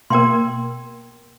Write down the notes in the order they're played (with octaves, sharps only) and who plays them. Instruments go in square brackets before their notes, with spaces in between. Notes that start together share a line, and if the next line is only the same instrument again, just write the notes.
[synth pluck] B2 A#3 G#6 [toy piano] A#4 G5 C6